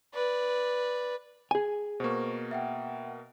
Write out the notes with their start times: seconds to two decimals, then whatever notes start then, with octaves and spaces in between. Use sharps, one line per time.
0.14 B4 D5
1.51 G#4 G#5
2.00 B2 A#3 C5 C#6
2.51 E5 F#5 G5